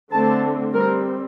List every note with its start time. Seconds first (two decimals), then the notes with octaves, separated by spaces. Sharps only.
0.13 D3 A3 C4 A5
0.74 G3 C4 A#4